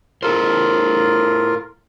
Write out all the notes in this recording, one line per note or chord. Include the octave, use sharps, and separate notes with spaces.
E4 F4 A4 A#4 C5